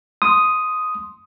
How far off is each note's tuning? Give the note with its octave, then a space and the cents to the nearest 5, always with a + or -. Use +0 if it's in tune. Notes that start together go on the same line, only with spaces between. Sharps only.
C6 +0 D#6 +0